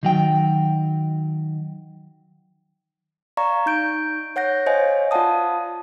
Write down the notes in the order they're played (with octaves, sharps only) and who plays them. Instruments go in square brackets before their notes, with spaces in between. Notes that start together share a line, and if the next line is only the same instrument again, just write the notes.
[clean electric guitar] D#3 F#3 G5
[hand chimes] D5 F5 A#5 C#6
D#4 G6 D7
C#5 F#5 G6 A#6
C5 C#5 D#5 F5 G#5
F4 D5 F5 F#5 A5 D#6